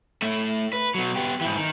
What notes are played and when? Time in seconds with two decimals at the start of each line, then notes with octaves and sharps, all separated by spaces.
0.22 A2 A3
0.73 B4
0.95 B2 F#3
1.16 B3 G4
1.41 G#2 E3
1.57 D#3